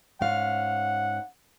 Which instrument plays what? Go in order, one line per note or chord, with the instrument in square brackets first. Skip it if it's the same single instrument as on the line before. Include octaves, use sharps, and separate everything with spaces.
[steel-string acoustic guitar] G#2 C#4 F5 [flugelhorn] F#5